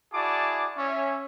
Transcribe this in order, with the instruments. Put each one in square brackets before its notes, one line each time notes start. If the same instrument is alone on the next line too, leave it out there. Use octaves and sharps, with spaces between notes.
[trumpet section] E4 F#4 G#4 D5 A5 D6
C#4 C#5 E5